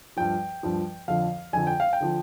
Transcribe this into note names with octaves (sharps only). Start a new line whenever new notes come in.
G2 F3 G5
G2 F3
F2 D3 F3 F5
F2 D3 F3 G#5
G5
F5
G5
D3 F3